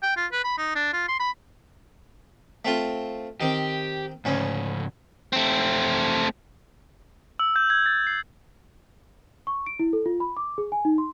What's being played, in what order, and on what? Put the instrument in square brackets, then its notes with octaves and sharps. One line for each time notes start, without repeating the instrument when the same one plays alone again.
[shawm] G5
F4
B4
B5
D#4
D4
F4
C6
B5
[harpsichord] A3 C4 F4
[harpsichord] D#3 C4 [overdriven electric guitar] G4
[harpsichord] D2 C#4 [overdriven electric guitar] G#2 C#3
[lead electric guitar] A3 C4
[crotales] E6
G6
G#6
A6
C7
[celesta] C#6
D7
E4
A4
F4
B5
D6
G#4
G#5
D#4
C6